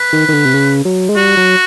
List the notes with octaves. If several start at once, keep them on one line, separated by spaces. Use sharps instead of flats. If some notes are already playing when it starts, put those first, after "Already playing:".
Already playing: B4
D#3
D#3
D3
C3
C#3
F#3
G#3
G3 F#4
F#3